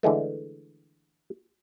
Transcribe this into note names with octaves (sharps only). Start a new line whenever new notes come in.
D3 E3 G#3 A3